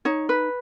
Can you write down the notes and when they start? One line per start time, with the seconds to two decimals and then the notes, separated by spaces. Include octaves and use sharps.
0.05 D#4 C#5
0.29 B4